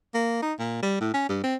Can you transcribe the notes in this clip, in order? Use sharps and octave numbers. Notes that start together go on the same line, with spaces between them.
A#3
D#4
A#2
G3
A2
C#4
G2
C4